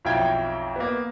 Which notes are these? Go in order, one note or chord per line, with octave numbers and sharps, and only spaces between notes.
B1 F2 E4 F4 G5 G#6
A#3 B3